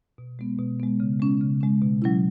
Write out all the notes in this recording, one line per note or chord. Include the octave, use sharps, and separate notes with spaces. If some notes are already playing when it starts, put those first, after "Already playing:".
B2
G#3 B3
B2
G#3 B3
C#3
G#3 C#4
C#3
G#3 C#4
B2
F#3 C#4 E4